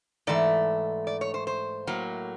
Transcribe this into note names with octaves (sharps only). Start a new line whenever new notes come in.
G#2 E3 A3 D5
D5
C#5
C5
C5
A2 F#3 A#3